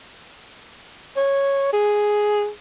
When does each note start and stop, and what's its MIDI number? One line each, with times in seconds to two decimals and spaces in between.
1.17 1.71 73
1.72 2.49 68